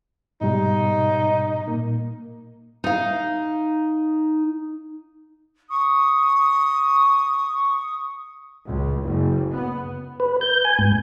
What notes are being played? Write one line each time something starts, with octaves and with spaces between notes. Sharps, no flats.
G#2 B2 G3 D#4
A#2 A#3
D#4 F5
C#6 D#6
C#2
F#1
B3
B4
G6
G#5
G#2